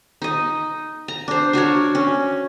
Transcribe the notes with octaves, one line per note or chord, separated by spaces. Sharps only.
D#4 D#5
A#5
D4 C5
D4 F#4 A#4 C#5
C#4